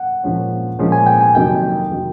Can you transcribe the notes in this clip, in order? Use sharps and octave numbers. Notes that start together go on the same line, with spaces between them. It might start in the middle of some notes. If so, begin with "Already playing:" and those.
Already playing: F#5
A#2 F3 G#3 C#4
A#2 F3 G#3 C#4
G#5
G5
G#5
F2 C3 D#3 F#3 A#3 G5
C3 D#3 F#3 A#3